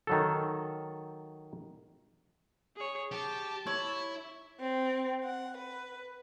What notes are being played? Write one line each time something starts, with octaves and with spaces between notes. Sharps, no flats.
D#3 F#3 A4
G#4 C#5
G4 A5
E4 C#5
C4
F#5
B4